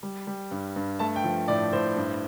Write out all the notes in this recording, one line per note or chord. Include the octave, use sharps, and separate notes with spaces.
G3
G3
G2
G2
A3 A5
G5
F3
A2 D5
A2 C5
G2